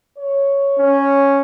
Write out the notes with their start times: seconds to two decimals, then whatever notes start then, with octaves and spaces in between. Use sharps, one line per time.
0.18 C#5
0.78 C#4